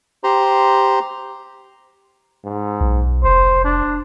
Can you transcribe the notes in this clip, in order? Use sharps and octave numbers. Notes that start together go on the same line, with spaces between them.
G4 C5 A#5 C6
G#2
B1
F1 C5
D4